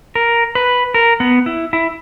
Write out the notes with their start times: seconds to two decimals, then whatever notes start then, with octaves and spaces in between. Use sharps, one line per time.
0.15 A#4
0.55 B4
0.94 A#4
1.20 B3
1.46 E4
1.73 E4